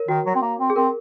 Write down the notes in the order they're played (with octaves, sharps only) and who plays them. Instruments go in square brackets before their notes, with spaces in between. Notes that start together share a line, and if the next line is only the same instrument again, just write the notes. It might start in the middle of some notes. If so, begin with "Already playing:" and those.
Already playing: [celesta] A#4 C#5
[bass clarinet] D#3 [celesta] F#4
[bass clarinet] F#3
C4
A#3
C4
[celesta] G#4
[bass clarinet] C4 [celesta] A#4